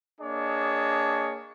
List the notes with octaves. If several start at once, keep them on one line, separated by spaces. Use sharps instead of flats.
A#3 D4 G#4 C#5 D#5 A5